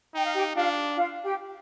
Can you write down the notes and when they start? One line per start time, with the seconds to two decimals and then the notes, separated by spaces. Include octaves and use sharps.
0.14 D#4 G5
0.25 F5
0.35 G4 G5
0.55 D4 F4 F5
0.97 F4 F5
1.24 G4 G5